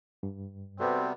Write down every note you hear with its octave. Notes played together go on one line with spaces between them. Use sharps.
G2
C3 G3 B3 C4 F#4 A4 B4